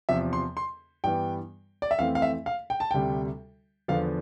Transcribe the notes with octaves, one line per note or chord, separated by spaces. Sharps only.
E2 C3 F3 E5
C6
C6
G2 E3 G3 B3 G5
D5
E5
F2 E3 A3 C4 F5
F5
E5
F5
G5
A5
D2 C3 G3 G5
E2 D3 F3 B3 F5